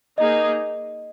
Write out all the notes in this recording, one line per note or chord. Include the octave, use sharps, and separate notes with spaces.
A#3 D#4 G#4 D#5